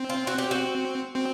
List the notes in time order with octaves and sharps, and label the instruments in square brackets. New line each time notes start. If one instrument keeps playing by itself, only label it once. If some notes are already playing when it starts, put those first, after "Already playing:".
Already playing: [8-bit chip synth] C4
[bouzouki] F4
F#4
G4
F#4
[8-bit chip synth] C4